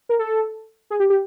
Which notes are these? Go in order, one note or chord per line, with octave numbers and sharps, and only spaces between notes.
A#4
A4
G#4
G4
G4